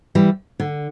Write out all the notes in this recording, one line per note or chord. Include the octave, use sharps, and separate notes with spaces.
E3 G3
D3